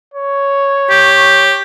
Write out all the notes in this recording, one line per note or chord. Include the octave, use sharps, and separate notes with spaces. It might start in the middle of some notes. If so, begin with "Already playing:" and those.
C#5
G4